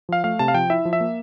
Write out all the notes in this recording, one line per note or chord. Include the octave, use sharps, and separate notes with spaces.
F3 F5
A3 F5
C3 A5
F5
F3 G5
E4 E5
F3
E5
A#3